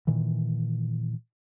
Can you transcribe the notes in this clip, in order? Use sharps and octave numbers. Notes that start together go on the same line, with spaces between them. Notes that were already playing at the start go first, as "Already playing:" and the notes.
A#2 D#3 E3